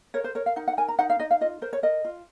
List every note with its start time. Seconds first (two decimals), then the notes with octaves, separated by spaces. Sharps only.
0.14 A#4 C#5
0.24 C5
0.35 A#4 C#5
0.46 F5
0.56 D#4 F#5
0.68 F#5
0.77 A#4 G#5
0.88 A#5
0.99 D#4 F#5
1.10 F5
1.20 D#4 D#5
1.31 F5
1.41 F4 D#5
1.62 A#4 C5
1.73 C#5
1.83 A#4 D#5
2.05 F4